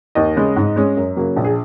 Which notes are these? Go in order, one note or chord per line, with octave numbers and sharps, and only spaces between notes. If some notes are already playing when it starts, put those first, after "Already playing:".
D#2 D#5
C#3 G#3
G#2
G#3 C#4
F#2
C#3 F#3 A#3
A#1
G#4